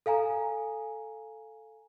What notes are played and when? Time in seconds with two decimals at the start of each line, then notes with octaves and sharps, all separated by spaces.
0.06 A4 F5 G#5 A#5